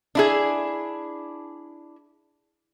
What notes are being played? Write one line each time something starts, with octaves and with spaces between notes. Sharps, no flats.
D4 E4 G#4